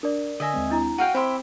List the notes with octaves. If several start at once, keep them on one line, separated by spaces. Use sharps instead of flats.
D4 A#4 D5
D3 D#5 E5 G#5 A#6
D#2 G#3 C4
D4 E4 A#5
F#4 F5 G5 D#7
C4 E4 G4 C5 E5 G5 C6